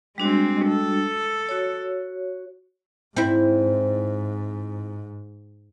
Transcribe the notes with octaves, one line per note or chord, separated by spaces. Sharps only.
G3 G#3 C4 D4 F#4
A4
F#4 C#5
G#2 C4 E4